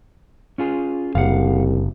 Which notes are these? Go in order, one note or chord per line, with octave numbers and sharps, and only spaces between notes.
C#4 F4 G#4
F#1 C2 F5 F#5